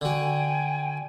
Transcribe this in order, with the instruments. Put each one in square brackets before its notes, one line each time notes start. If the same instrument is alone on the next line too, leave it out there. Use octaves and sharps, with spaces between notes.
[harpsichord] D3 F#4 [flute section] G5 G#5